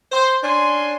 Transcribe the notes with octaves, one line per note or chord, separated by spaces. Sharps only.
C5
C#4 D4 G#5 C6